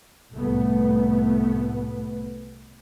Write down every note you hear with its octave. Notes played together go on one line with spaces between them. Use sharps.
C2 A2 A3 B3